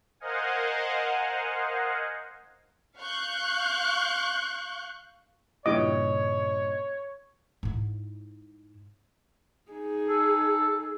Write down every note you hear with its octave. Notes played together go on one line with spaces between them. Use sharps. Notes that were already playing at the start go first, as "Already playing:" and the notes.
A#4 C5 D#5 F5 F#5 G#5
F5 C#6 F#6 G6
G2 A#2 C#3 E4 G4 C#5 D#5 D6
G#2 E4
D#4 G#4
A4